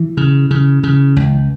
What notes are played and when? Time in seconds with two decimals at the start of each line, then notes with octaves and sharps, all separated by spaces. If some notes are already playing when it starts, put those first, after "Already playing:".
Already playing: E3
0.17 C#3
0.51 C#3
0.83 C#3
1.16 C#2